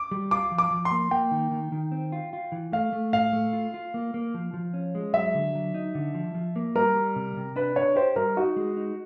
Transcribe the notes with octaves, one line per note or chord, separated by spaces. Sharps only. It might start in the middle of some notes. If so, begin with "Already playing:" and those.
Already playing: D6
G3
F4 D6
F3
D6
F3
C6
A#3
A#3 G5
D#3
D#3
D#3
C4
F4
F4
E3
A3 F5
A3
A2 F5
A3
F4
F4
A#3
A#3
F3
F3
C#4
G#3
F#3 E5
D3
F#3
D#4
D3
F3
F3
A#3
G3 A#4
G3
C3
C3
D4 B4
D4 C#5
G4 C5
G3 A#4
D#4 F#4
G#3
D#4